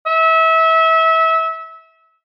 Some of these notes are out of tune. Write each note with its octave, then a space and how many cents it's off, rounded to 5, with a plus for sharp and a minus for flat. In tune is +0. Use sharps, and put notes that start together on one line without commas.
E5 -25